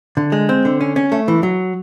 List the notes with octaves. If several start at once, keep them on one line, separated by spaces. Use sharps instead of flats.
D3
G#3
C4
D3
C#4
C#4
A3
E3
F#3